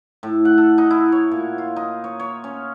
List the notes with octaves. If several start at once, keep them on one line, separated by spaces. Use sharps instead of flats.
A2
F#5
A4
D#4
E4
C#5
A#2
F4
D#4
C#5
C#5
C#4